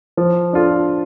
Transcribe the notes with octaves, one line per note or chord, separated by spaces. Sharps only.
F3
D4 F4 A4